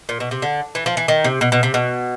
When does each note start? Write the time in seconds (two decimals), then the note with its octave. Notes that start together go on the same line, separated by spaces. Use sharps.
0.09 A#2
0.20 B2
0.31 C3
0.42 D3
0.75 E3
0.86 F3
0.97 E3
1.08 D#3
1.24 C3
1.41 B2
1.52 B2
1.63 C3
1.74 B2